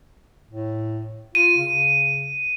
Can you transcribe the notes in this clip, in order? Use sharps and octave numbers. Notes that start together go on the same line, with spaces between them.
A2
F4 D#7
C#3